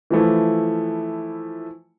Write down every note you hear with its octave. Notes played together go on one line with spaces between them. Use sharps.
E3 F3 A3 E4